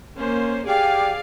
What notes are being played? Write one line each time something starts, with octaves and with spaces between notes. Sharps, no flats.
A#3 C#4 C5
G4 G#4 D5 F5